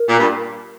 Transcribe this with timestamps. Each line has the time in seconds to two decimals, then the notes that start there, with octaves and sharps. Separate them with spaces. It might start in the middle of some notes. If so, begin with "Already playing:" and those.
Already playing: A#4
0.09 A#2
0.19 G2